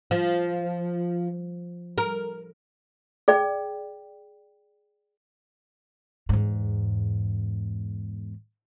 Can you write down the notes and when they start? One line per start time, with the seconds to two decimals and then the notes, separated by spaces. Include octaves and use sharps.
0.11 F3
1.98 A#4
3.28 G#4 D5 G5
6.29 E2 G#2